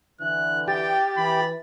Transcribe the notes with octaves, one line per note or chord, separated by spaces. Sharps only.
D3 E3 F#6
G4 G5 A6
E3 B5